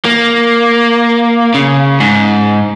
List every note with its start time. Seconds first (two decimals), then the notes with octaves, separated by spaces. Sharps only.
0.05 A#3
1.54 C#3
2.00 G#2